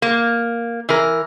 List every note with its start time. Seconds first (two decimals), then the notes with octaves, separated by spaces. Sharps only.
0.02 A#3
0.89 E3 A#4